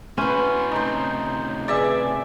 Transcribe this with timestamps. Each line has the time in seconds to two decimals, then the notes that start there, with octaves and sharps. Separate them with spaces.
0.18 C#4 E4 F#4 B4 C5
0.72 A2 C3 D#4 C5
1.68 G#4 B4 D5 E5 G#5 E6